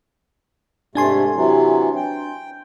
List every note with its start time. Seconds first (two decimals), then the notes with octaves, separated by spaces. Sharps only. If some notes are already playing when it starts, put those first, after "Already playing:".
0.95 G#2 C3 A3 D4 G#5 C6
1.35 C3 E3 F#3
1.96 G5